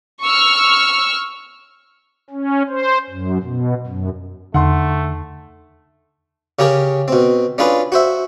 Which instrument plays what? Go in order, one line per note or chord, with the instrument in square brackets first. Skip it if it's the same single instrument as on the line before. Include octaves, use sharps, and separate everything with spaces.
[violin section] C#6 E6 F6
[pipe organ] C#4
C5
F#2
B2
F#2
[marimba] E2 [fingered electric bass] D3 [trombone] A3 [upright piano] F#5 C6
[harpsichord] C#3 C#4 G4 G#4 A#4 C#5
B2 C4
C#4 D4 F4 G#4 B4
F#4 C5 E5